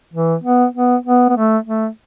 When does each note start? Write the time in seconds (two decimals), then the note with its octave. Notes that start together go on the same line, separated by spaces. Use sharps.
0.14 E3
0.44 B3
0.75 B3
1.06 B3
1.29 B3
1.37 A3
1.66 A3